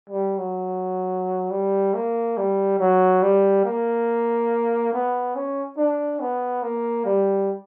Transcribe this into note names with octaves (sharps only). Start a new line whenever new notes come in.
G3
F#3
G3
A#3
G3
F#3
G3
A#3
B3
C#4
D4
B3
A#3
G3